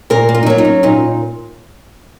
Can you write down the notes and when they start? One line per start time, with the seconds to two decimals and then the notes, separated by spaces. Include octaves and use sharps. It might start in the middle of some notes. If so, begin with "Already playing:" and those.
0.10 A#2 A#4
0.29 A#3
0.34 F4
0.43 D#4
0.46 F#3 F4
0.58 D#4
0.65 C#4
0.83 A#2 D#4